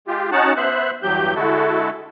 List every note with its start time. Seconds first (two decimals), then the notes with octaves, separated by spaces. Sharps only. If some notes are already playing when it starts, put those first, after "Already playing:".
0.07 G#3 F4 G4
0.32 C#4 D#4 F#4 F#5 A5
0.56 B3 C5 E5 F#6
1.03 E2 G2 F#3 G4 G6
1.35 D3 G#3 E4 F#4 A4